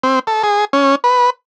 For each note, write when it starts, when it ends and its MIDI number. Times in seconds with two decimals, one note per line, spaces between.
0.03 0.19 60
0.27 0.43 69
0.43 0.65 68
0.73 0.95 61
1.04 1.30 71